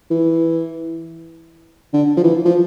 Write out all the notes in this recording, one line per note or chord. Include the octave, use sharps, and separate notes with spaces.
E3
D3
F3
E3
F3